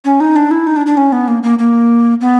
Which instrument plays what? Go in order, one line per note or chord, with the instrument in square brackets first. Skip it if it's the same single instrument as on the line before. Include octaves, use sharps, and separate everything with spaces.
[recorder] C#4
D#4
D4
E4
D#4
D4
D4
C#4
B3
A#3
A#3
A#3
B3